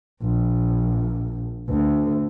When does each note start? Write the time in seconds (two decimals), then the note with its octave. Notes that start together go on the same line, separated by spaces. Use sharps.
0.22 A#1
1.69 D2